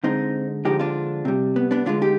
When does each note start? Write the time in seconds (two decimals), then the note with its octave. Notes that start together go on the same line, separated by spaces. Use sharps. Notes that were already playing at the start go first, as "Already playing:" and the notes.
0.04 D3 G#3 C4 D#4
0.65 D3 F3 G#3 D#4 G4
0.79 D4 F4
1.25 C3 G3
1.56 B3
1.71 B3 D4
1.86 D3 G#3 D4 F4
2.02 D#4 G4